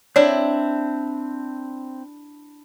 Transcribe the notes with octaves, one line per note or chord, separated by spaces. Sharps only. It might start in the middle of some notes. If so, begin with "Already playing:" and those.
C4 D4 E4 C#5 D5